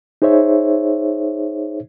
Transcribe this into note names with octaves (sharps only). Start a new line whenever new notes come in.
D#4 G#4 C5 C#5 E5